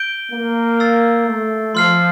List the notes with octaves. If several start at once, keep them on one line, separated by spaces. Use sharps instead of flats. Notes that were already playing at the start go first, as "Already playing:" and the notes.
Already playing: G6 D7 G7
A#3
E6 A6 C7
A3
F3 C6 F6 C7